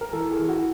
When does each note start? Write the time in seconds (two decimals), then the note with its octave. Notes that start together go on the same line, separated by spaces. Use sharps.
0.01 A#4
0.13 E3 A4
0.31 G#4
0.39 E3
0.48 F#4